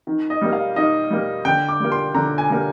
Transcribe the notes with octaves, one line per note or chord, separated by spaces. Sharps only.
D#3
D#5
G3 A#3
F5
D#3 D#5
G3 A#3
D3 G5
D6
G3 A#3
C6
D3 A#5
G#5
G3 A#3